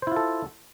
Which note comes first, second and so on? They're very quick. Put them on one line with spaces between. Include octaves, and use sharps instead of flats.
C5 E4 F4 A4